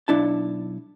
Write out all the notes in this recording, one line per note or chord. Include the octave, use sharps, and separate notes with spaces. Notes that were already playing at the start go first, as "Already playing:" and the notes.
B1 D4 E4 A5